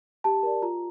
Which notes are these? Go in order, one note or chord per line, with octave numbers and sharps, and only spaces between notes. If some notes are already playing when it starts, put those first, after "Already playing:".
G4 A5
A#4 D5
F4 A#5